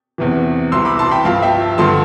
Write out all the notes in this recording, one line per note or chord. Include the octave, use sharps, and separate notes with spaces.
E2 C3 E3
C2 C3 E3 C6 E6
B5 D6
A5 C6
G5 B5
G2 F3 F5 A5
E5 G5
G2 D3 F3 A5 C6